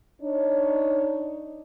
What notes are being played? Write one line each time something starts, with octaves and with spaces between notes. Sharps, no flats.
D4 D#4 C#5